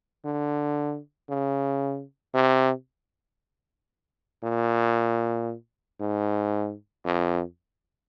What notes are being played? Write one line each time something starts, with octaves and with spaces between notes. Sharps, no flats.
D3
C#3
C3
A#2
G#2
F2